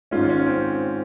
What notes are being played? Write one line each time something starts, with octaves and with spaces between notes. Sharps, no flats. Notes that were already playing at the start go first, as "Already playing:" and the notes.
G#2 D#3 G#3 C#4 F4
C#4
C4